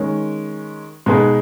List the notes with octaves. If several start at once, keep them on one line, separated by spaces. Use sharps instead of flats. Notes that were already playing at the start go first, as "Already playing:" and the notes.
Already playing: D#3 G#3 C#4
B2 G#3 D#4 G#4 B4